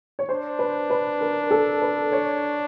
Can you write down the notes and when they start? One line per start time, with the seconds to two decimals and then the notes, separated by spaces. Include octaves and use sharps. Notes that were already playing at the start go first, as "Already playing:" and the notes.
0.19 C#5
0.28 D4 C5
0.59 B4
0.90 B4
1.21 A#4
1.51 A4
1.82 B4
2.12 C#5